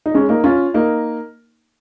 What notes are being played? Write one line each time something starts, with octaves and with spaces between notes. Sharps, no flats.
D#4
G#3 C#4
A#3 D#4
C#4 F4
A#3 D#4